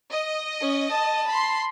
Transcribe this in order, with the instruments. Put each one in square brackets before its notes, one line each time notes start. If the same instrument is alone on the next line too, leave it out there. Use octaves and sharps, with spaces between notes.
[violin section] D#5
[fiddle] C#4
A5
[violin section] B5 C6